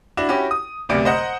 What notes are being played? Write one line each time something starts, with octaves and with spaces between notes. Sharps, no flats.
D4 E4 F#4
C#4 E4 F#4 G4
D#6
F#1 D2 C3 B3 D5 D7
C5 D#5 F#5 A#5